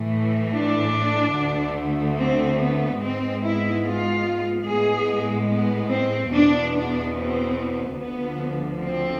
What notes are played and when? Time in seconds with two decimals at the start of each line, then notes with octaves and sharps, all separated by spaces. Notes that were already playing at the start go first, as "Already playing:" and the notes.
Already playing: A2 E3 A3
0.54 D4
1.36 D2 D3 A3
2.19 C4
2.60 B3
3.01 G#2 G#3 B3 C4
3.43 E4
3.85 F4
4.67 A2 G#3 B3 G#4
5.50 B3
5.91 C4
6.32 E2 B2 B3 D4
6.74 D4
7.15 C4
7.98 D2 D3 F3 B3
8.81 C4